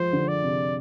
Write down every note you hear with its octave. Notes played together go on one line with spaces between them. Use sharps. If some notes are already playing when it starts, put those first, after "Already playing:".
Already playing: F3 G#3 C5
D3
D5
C3